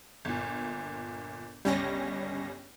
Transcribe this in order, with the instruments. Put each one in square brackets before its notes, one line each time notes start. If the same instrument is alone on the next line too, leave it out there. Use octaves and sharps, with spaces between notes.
[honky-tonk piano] G1 A#2
[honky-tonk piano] G1 C#2 [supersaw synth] G3 C#4 A#6